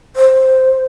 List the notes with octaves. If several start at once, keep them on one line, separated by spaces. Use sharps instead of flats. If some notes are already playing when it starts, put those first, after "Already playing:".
C5